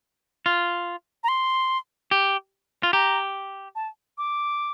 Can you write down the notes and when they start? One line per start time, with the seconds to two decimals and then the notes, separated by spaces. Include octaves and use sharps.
0.46 F4
1.24 A#5
1.28 C6
2.11 G4
2.83 F4
2.93 G4 A#5
3.75 A5
4.18 D6